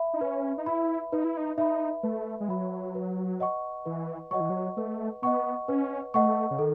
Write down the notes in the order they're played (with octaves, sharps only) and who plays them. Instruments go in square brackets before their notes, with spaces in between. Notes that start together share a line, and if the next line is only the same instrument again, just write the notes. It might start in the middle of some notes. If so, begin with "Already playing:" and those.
Already playing: [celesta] E5 B5
[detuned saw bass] D#4
[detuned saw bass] C#4 [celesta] B4
[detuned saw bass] D#4
[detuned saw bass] E4 [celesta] E5 B5
[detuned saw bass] D#4 [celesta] B4
[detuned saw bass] E4
D#4
[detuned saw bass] D#4 [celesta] E5 B5
[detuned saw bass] A3 [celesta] B4
[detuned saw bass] G#3
[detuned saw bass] F#3 [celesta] E5 B5
[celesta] B4
D#5 F#5 C#6
[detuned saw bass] E3 [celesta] B4
[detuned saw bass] F#3 [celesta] D#5 F#5 C#6
[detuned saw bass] E3
F#3
[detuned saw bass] A3 [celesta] B4
[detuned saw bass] B3 [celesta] D#5 F#5 C#6
[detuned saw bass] C#4 [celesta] B4
[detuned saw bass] A3 [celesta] D#5 F#5 C#6
[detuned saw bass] C#3
[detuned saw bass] D#3 [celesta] A4